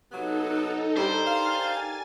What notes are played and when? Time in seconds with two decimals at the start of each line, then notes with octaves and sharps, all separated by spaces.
0.12 C3 F#3 B3 D#4 A4
0.97 G2 D3 G3 D4 G4 A#4 C5
1.27 F5 G#5 A6